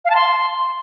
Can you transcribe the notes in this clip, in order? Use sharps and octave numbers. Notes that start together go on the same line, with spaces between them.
F5
A5
C6